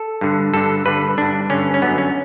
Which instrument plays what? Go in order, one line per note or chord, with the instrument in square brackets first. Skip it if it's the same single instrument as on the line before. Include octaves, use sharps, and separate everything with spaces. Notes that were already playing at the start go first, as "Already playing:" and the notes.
Already playing: [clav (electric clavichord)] A4
G2 D3
G2 D3 A4
G2 D3 B4
G2 D3 D4
G2 D3 C#4
C#4
F#2 D3 B3
C#4